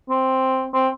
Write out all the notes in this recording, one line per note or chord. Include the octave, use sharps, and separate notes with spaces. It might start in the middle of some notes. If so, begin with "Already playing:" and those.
C4
C4